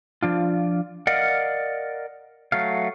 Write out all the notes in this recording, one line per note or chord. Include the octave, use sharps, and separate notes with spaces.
F3 D4 F4
A#4 D5 D#5 F5 F#5
F#3 A3 F5